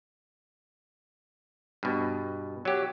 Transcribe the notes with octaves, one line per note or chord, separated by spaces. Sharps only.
G2 B2
F#3 G4